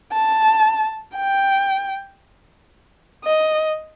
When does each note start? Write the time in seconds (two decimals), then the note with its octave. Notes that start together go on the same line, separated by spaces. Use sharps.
0.12 A5
1.16 G5
3.24 D#5